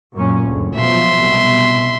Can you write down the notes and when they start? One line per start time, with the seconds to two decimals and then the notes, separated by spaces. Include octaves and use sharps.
0.15 F#2 A#2 C#4
0.46 F#1 D2
0.76 B2 F3 F#3 E5 C6
1.16 C2 B2